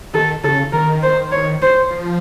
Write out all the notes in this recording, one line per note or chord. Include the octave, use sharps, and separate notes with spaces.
D#3 A4
C#3 A4
D#3 A#4
C5
C#5
C5
F3